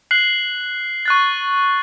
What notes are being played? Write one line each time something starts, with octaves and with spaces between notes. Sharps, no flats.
F#6 C7 F#7
C#6 F#6 A6